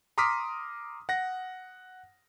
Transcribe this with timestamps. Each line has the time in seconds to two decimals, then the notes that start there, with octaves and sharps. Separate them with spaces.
0.18 A#5 C6 D6 D#6 F6 B6
1.09 F#5 A#6